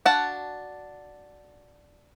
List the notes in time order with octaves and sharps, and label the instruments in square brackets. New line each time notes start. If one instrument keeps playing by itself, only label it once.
[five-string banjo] D4 F#4 F5 F#5 A5